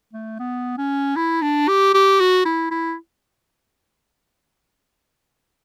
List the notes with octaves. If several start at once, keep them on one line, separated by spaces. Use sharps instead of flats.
A3
B3
C#4
E4
D4
G4
G4
F#4
E4
E4